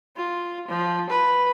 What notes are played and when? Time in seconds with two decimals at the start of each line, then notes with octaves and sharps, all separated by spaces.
0.17 F4
0.68 F3
1.09 B4